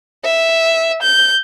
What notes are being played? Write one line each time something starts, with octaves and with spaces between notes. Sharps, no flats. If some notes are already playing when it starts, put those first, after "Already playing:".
E5
G6